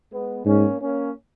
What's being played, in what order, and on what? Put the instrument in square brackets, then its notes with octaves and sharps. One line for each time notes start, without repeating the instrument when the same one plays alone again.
[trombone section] G#3 B3
[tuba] G#2 [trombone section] A#3 C#4
[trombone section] A#3 C#4